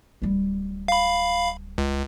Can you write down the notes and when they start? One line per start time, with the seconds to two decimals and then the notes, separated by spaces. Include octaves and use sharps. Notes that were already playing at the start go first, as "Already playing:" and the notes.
0.22 D1 G3
0.88 F5 B5
1.78 C#2